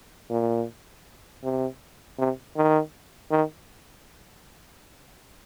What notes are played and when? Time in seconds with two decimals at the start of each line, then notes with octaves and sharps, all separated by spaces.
0.31 A#2
1.43 C3
2.19 C3
2.56 D#3
3.31 D#3